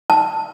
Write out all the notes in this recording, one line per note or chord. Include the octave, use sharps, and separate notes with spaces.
A5